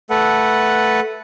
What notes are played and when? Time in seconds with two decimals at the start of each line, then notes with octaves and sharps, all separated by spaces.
0.10 A3 A4 B4 F#5